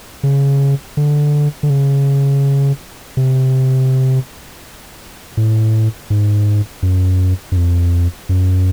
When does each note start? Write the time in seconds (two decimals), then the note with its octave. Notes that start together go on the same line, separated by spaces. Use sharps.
0.23 C#3
0.97 D3
1.63 D3
1.70 C#3
3.17 C3
5.37 A2
6.10 G#2
6.83 F#2
7.52 F#2
7.57 F2
8.29 F#2